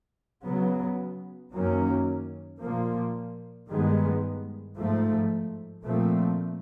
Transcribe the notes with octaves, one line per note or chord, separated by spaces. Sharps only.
C#3 F#3 B3
F#2 D#3 F#3 A#3 C#4
A#2 F3 A#3
G2 D#3 G#3 B3
G#2 F3 A3
A#2 F3 A3 C4